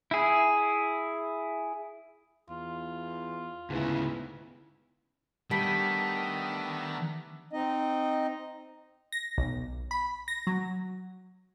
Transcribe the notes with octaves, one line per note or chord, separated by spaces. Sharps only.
E4 G#4
E2 F4
D2 G#2 C#3 B3 E4
D#3 G3 A3 B3 D4 A5 B6
C4 D#4 D#5
A#6
B1
B5
A#6
F#3